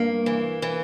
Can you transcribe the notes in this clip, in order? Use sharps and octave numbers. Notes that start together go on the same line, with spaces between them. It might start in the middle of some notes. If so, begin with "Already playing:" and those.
Already playing: G2 A#3
E3
E3